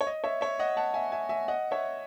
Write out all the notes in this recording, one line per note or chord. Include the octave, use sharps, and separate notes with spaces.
C#5
D#5
C#5 E5
C#5 E5
D#5 F#5
F#5 A5
E5 G#5
E5 G#5
E5 G#5
D#5 F#5
C#5 E5